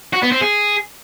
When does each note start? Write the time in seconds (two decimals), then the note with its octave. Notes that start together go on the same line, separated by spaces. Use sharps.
0.13 F#4
0.22 B3
0.32 C4
0.41 G#4